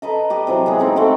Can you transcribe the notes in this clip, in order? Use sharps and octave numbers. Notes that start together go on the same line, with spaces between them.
A4 B4 D#5 A#5
G4 D5 D#5
C3 E3 F#3
G#3 B3 G#4
A#3 C4 D#4 G5
A3 C4 F#5 G5